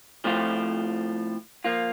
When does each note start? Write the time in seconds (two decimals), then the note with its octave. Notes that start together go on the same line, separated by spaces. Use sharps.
0.24 A2 F3 A3 C4 F4
1.64 F3 A#3 F4